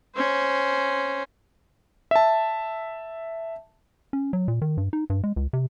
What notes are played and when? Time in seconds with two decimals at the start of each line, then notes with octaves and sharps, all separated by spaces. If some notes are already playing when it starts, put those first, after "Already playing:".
0.15 C#4 C5
2.11 E5 A5
4.13 C#4
4.33 F#3
4.48 A#2
4.62 D#3
4.77 G2
4.93 D#4
5.10 G2
5.24 G#3
5.36 C#2
5.53 C3